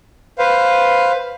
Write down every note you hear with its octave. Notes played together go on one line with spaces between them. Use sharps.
B4 C5 F5